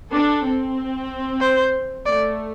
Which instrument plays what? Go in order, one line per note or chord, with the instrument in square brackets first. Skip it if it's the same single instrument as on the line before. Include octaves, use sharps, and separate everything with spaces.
[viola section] D4 [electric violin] A4
[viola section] C4
[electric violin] C5
[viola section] A3 [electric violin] D5